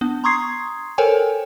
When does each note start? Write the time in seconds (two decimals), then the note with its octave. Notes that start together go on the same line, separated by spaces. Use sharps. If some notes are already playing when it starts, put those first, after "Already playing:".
0.01 B3 D4
0.24 A#5 C6 C#6 D#6 G#6 C7
0.98 A4 A#4 C5 C#5 G5 G#5